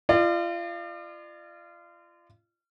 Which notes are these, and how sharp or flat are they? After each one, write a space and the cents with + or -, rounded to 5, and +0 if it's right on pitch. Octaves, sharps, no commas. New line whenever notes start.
F4 -30 D5 +40